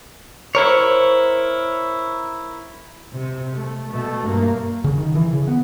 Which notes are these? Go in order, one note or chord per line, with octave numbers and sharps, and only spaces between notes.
E4 A#4 C5 C#5
C3
A3
B2 A3
G2 A#3
C#3
D#3
E3
C#3
B3